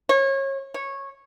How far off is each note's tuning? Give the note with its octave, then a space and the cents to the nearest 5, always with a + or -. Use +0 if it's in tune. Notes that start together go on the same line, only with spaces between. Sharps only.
C#5 -30
C#5 -15